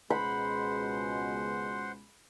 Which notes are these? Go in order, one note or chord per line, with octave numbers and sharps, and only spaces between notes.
C#2 B2 G#3 C5 F#5 B5 C6